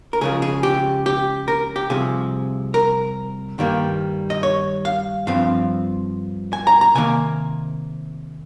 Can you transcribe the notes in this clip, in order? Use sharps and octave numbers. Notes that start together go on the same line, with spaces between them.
A#4
C#2 C#3 F3 G#4
G#4
G4
G4
A#4
G4
C2 C3 F3 G#4
A#4
G2 D#3 G3 A#3
D#5
C#5
F5
G2 F3 C4 F5
G#5
A#5
A#5
C3 D#3 A#3 G#5